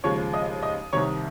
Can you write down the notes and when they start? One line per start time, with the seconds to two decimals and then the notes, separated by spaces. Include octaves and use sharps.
0.04 D#2 C#3 F3 G#3 C#5 C#6
0.34 D#5 D#6
0.63 D#5 D#6
0.93 C2 C3 D#3 C#5 C#6